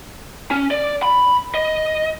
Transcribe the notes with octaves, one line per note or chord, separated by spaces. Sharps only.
C#4
D5
B5
D#5